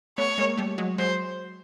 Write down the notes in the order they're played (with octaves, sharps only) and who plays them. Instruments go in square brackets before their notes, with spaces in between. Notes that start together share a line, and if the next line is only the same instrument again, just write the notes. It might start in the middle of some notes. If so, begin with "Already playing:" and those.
[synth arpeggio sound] A3 B3 [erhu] C#5
[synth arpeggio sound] G#3 A#3
G3 A3
F#3 G#3
[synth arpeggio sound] F#3 G#3 [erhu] C5